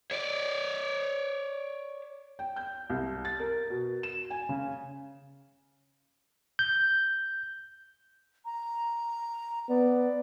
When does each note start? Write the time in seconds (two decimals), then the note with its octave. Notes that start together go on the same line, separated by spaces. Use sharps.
0.11 C#5 D5
2.39 G5
2.56 G6
2.90 C2
3.25 A6
3.39 A#4
3.70 B2
4.03 E7
4.30 G#5
4.49 C#3
6.59 G6
8.45 A#5
9.69 B3 D5